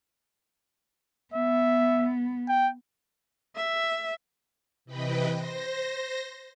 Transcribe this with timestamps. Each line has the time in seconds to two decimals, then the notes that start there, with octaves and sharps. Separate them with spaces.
1.34 B3 E5
2.48 G5
3.56 E5
4.85 C3 E3 B4 D#5 G5 B5
5.29 C5 A#6